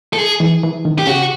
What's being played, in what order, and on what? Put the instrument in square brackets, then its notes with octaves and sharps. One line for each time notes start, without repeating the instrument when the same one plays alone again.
[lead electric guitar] A4
G#4
[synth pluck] E3
E3
D#3
[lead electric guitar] G4
[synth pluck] C#3 [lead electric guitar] F#4